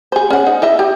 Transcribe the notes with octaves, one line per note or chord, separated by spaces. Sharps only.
G#4 C5
C#4 F#5
D#4
E4 D#5 E5
G4